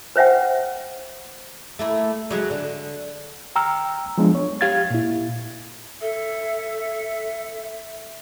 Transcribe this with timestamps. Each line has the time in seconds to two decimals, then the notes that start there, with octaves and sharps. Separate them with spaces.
0.16 B4 C5 E5 F#5 G5
1.79 A3 A#3 E4
2.30 C#3 F#3 G#3
2.51 D3
3.56 G5 A#5 E6 F6
4.18 F3 F#3 G#3 B3 D4 F4
4.35 C#5
4.61 G4 F5 G#6 A6
4.90 A#2 E4
6.01 A4 E5